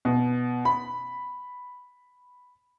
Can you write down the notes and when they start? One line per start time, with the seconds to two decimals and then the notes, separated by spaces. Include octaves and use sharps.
0.05 B2
0.65 B5